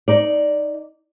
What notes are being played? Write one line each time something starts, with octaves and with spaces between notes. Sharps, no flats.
D#4 D5